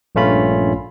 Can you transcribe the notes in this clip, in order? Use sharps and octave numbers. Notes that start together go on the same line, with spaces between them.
A#1 G2 A3 C#4 F4 B5